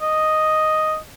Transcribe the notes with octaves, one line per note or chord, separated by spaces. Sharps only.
D#5